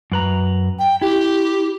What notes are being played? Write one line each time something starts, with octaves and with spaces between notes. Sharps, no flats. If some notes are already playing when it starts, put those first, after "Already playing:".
F#2 B4 A#5
G5
E4 G4